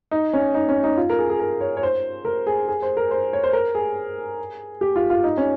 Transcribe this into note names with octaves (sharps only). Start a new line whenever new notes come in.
D#4
C#4
D#4
C#4
D#4
F4
A#4
G#4
G#4
A#4
C#5
C#5
C5
A#4
G#4
G#4
C5
A#4
C5
C#5
C5
A#4
G#4
G4
F4
F4
D#4
C#4